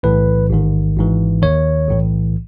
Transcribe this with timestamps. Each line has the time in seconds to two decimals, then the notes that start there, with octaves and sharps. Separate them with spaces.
0.03 B1 A2 E3 B4
0.50 A1 G#2 D#3
0.97 G#1 G#2 E3
1.42 D#2 D#3 C#5
1.89 B1 A2 E3